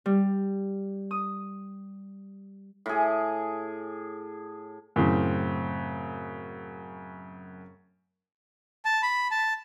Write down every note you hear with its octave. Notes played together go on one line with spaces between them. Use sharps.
G3
D#6
A2 G#4
F#2 A2 C#3 C4
A5
B5
A5